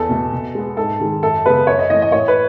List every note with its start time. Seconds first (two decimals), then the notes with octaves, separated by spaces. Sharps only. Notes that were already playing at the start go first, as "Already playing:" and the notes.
Already playing: E2 A4
0.09 B2 A3
0.32 B2
0.55 G#3 B3
0.77 G#2 A4
1.00 D#3 G#3
1.23 F#2 A4
1.46 C#3 G#3 B3 B4
1.67 F#2 C#5
1.79 D#5
1.90 E3 A3 D#5
2.02 D#5
2.12 A2 C#5
2.28 B4